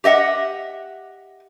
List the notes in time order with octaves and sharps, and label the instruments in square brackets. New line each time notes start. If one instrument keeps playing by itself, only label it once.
[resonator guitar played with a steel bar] G4 D#5 E5 F#5